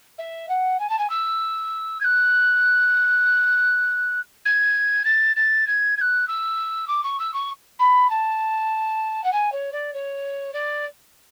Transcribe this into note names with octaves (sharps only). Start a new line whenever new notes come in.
E5
F#5
G#5
A5
G#5
E6
G#6
F#6
G#6
A6
A6
G#6
G#6
F#6
E6
D6
C#6
E6
C#6
B5
A5
F#5
G#5
C#5
D5
C#5
D5